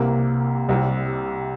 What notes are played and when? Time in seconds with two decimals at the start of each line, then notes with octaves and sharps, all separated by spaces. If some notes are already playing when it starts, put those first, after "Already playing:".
Already playing: C2 C3 A#3
0.68 C2 C3 G3